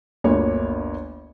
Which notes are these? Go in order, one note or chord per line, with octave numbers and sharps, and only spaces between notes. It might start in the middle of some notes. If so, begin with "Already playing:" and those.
G1 D2 A#3 C#5